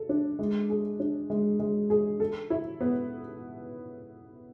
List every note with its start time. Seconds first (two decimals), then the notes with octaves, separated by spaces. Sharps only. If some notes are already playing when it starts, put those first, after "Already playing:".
Already playing: A4
0.09 D4
0.39 G#3
0.70 G#4
1.00 D4
1.30 G#3
1.60 G#3
1.90 G#4
2.20 A4
2.50 E4
2.80 B3